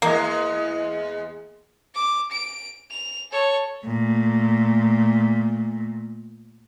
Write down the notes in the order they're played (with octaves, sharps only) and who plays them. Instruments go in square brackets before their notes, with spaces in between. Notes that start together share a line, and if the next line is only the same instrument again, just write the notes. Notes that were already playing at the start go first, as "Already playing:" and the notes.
[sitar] E2 G#3 [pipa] A#3
[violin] D6
D7
F7
A4 C#5
[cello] A#2 A3